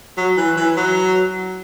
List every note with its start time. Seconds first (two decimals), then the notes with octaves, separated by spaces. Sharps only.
0.17 F#3
0.37 E3
0.57 E3
0.76 F#3